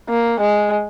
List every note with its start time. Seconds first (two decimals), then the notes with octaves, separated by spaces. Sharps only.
0.09 A#3
0.39 G#3